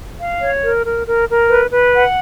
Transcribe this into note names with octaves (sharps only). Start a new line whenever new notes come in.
F5
C#5
A#4
A#4
A#4
A#4
B4
B4
F#5